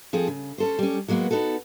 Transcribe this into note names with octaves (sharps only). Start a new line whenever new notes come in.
F3 C4 G#4 A4
C#3
C#4 A4 C5
G3 C#4
F#3 G#3 A#3 B3 F#4
B3 D#4 F#4 A4